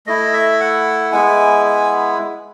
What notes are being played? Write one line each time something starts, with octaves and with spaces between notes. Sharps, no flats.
A3 E4 D#5
E5
F#5
G#3 B3 E4 G#5
G#5